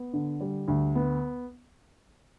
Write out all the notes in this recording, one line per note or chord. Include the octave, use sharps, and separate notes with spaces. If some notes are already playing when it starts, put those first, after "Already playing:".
Already playing: B3
D3
G3
D2
B3